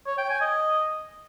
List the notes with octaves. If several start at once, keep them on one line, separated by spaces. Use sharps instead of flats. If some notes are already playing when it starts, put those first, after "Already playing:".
C#5
G5
G#5
D#5